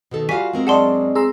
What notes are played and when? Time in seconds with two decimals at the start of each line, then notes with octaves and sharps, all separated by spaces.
0.11 B2 D#3 A4
0.29 G3 F4 F#4 F5 G#5 B6
0.53 G#3 C4 A#4
0.67 F#2 D4 G#4 D5 D#5 F#5 A5 C6
1.15 G#4 A#5 C6 E6